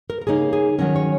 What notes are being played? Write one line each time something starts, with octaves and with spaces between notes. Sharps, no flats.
A#4
A#4
C#3 A#3 D#4 G#4
G#4
D#3 F#3 C#4 A#4
C#5